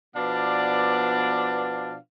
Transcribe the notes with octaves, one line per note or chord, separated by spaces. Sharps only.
B2 F3 B3 D4 D5 F5